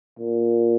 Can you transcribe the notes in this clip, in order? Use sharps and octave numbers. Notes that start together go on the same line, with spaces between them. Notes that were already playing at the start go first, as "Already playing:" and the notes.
A#2